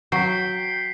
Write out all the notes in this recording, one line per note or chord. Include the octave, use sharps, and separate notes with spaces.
F#3 G5 B6 C7